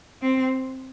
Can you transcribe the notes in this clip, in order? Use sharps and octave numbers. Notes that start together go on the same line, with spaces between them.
C4